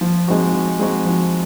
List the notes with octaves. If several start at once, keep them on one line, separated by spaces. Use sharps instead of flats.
F3
G#3 C4 D#4 F#4
F3
G#3 C4 D#4 F#4
F3